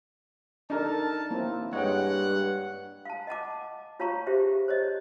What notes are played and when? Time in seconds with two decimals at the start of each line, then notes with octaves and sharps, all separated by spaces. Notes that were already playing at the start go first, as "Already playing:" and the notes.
0.70 D4 D#4 A4 A#4 A5
1.31 A#3 C4 E4
1.73 G2 G#3 C#5 D#5 F#5 G5
3.05 F5 A5
3.27 D#5 F#5 A5 D6
4.00 F4 C#5 F5 A5 A#5 C#6
4.27 G4 G#4 C5 E5
4.68 C5 C#5 D#5